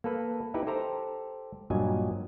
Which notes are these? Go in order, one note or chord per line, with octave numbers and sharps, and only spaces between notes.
A#3 A4 B4
D#4 E4 G4 B4
G4 A4 C5 A#5
G2 A#2 F#3 D#5 G#5